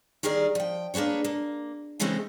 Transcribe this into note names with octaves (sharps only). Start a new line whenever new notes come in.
D#3 G3 G#4 A#4 D5
F3 G5
A#3 D4 G#4 B4 C#5
A#3
C#3 E3 G#3 A3 C4 C#4